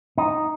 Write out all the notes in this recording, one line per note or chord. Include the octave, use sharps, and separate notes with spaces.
D#4